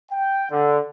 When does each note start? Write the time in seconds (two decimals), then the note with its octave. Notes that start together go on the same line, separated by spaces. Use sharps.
0.12 G5
0.51 D3